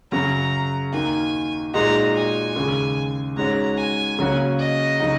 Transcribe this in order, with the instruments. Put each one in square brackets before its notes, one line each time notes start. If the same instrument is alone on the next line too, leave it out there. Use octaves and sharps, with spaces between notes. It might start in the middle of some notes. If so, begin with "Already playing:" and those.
[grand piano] F#2 C#3 F#3 [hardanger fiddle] A#5
[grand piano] D#2 D#3 A#3 F#4 [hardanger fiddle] G#5
[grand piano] A#2 G#3 D#4 F#4 [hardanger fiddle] A#5
[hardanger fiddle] G#5
[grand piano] D#2 C#3 G#3
[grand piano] G#2 G#3 C#4 F#4 [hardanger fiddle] A#5
[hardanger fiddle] G#5
[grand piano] C#3 F#3 A#3 C#4 F#4
[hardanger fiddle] D#5
[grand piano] C#3 F#3 D#4 F#4